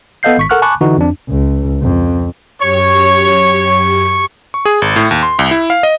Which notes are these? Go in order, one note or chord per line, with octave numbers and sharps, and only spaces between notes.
B3 A4 D#5 F5 G6 C7
G#1 C#6 B6
A4 A#4 F#5 C#6 F6 F#6
G#5 A5 B5 C#6 D6 F#6
D3 E3 D#4 F#4
F2 D4
C#2
F2
F#2 G4 C#5 C#6 G#6
C#6
G#4
G#1
A2
D#2
C6
C2
E4
F5
D#5